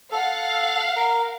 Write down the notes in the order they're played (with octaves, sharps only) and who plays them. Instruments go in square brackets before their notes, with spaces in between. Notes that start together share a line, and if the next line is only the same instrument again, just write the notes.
[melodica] A4 [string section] F5 F#5
[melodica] A#4